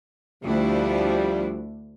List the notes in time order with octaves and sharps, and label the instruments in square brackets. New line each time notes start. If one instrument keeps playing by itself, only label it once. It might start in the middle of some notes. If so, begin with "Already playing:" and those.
[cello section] D2 D4 E4 [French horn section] F3 G3